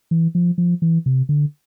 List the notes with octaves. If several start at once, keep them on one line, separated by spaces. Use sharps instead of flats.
E3
F3
F3
E3
C3
D3